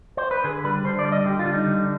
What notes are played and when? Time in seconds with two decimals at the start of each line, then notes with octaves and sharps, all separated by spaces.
0.17 C5
0.31 B4
0.44 D3 G#4
0.64 G3 B4
0.84 D3 C5
0.99 D5
1.05 G3
1.12 D#5
1.25 D3 G4
1.39 F4
1.46 G3
1.54 D#4
1.67 D3